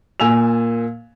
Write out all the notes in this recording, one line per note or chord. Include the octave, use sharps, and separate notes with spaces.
A#2 G#5 E6 F7